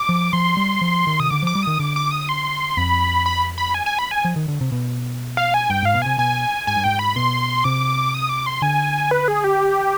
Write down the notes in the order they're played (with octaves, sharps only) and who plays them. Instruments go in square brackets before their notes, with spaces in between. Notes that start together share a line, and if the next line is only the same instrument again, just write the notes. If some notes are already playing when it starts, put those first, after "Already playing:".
Already playing: [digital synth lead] D6
[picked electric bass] F3
[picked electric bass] F3 [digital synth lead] C6
[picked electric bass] G3
F3
D#3
[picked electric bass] C3 [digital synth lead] D#6
[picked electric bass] D3 [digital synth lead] D6
[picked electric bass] F3 [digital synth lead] D6
[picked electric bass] G3
[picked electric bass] D#3 [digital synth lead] D#6
[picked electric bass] D3 [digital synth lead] D6
[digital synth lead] D6
D#6
C6
[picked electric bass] F2 [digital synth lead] B5
[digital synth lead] B5
B5
G#5
G#5
B5
G#5
[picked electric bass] F3
D#3
D3
C3
B2
[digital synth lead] F5
G#5
[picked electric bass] G2 [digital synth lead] G5
[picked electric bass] G#2 [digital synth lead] F5
[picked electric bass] B2
[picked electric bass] C3 [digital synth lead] G#5
[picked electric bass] B2 [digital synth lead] G#5
[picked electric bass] G#2 [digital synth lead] G#5
[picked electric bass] G2
[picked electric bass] G#2 [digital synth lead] G5
[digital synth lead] B5
[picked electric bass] B2 [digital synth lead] C6
[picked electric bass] C3 [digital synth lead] D6
[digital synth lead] D#6
D6
C6
[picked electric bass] D3 [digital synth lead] G#5
[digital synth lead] B4
G#4
G4